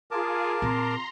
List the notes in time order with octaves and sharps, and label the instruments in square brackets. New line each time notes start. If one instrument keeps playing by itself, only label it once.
[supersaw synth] F4 G#4 [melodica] A#4 A5 D6
[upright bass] A#2 C4 [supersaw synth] A#5 C6